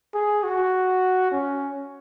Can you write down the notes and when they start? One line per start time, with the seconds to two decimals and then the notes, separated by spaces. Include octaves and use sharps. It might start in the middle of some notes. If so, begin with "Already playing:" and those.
0.14 G#4
0.43 F#4
1.31 C#4